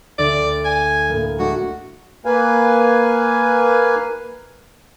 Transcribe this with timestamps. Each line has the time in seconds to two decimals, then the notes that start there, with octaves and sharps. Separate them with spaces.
0.19 D2 D5 E6 A#6
0.65 G#5
1.10 A2 A#3
1.39 G#3 A3 D4 F#4
2.25 A#3 B4 F5 G#5